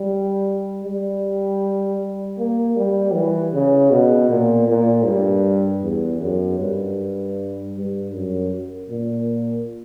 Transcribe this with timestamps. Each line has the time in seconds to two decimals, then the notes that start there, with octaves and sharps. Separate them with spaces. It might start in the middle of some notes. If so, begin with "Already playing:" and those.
Already playing: G3
0.84 G3
2.38 A#3
2.76 G3
3.14 E3
3.53 C#3
3.91 B2
4.30 A#2
4.68 A#2
5.06 G2
5.83 E2
6.21 F#2
6.59 G2
7.76 G2
8.13 F#2
8.90 A#2